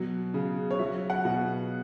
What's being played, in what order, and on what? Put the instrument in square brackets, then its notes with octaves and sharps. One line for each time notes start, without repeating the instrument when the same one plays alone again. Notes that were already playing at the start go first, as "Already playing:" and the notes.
Already playing: [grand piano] B2 F#3
C#3
C#5
F#3 E5
F#5
B2